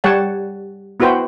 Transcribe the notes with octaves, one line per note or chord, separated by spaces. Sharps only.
G3 C#5 F#5 G5 A5
B3 E4 F#4 B4 C5 G5